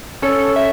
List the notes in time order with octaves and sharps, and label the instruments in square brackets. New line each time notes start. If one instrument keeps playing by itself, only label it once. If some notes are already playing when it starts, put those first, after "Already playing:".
[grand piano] C#4 [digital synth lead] A4
[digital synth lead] E5